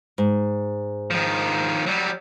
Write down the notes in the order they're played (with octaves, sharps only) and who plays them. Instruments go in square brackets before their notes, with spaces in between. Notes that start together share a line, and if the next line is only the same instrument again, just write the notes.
[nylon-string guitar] G#2
[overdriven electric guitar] D#3 F3
F#3 G3